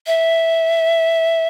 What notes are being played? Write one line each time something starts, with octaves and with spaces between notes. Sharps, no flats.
E5